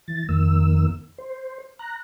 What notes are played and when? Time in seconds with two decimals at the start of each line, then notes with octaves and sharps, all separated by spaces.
0.08 E3 A6
0.29 F2 D#3 A#3 E6
1.18 C5
1.79 A#5 F#6